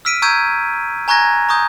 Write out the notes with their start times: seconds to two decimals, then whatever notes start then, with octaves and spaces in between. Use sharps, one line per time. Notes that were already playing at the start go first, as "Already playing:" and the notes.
0.05 E6 F6 B6 D7 D#7
0.22 A#5 C#6 E6 G6 G#6 D#7
1.08 G#5 A#5 C#6 F#6 G#6 A#6
1.49 A#5 C#6 D#6 G6